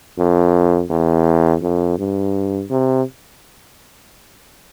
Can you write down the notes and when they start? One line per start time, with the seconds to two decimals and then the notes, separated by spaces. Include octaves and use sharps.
0.18 F2
0.90 E2
1.63 F2
1.99 G2
2.70 C3